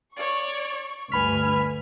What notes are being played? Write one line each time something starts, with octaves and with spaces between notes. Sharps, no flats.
C#5 D5 C#6
D2 G2 B4 G#5 B5 F6 B6